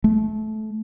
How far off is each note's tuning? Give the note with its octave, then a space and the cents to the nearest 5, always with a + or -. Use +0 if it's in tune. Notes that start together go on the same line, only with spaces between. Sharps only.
A3 -25